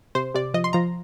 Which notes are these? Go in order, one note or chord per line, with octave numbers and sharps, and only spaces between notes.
C3 C5
C3 D5
F3 D#5
C6
F3 A#5